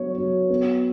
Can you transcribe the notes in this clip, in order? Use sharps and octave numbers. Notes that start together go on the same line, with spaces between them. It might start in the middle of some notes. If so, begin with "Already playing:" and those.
Already playing: F#3 B3 C#5
F#3
B3